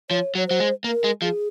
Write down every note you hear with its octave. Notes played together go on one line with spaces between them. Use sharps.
F3 C#5
F#3 C#5
F#3 C5
G#3
A#3 A#4
G#3
F3 G#4